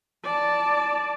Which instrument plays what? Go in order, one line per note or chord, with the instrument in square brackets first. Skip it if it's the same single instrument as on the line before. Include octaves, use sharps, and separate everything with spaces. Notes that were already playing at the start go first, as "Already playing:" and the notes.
[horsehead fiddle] D5 A5